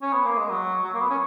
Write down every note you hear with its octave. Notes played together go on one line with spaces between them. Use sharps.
C#4
B3
A#3
G#3
F#3
F#3
A#3
B3
C#4